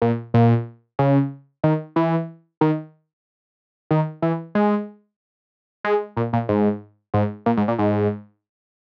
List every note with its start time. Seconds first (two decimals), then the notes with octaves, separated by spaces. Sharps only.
0.02 A#2
0.34 A#2
0.99 C#3
1.64 D#3
1.96 E3
2.61 D#3
3.91 D#3
4.22 E3
4.55 G#3
5.84 G#3
6.17 A#2
6.33 A#2
6.49 G#2
7.14 G#2
7.46 A#2
7.57 G#2
7.68 A#2
7.78 G#2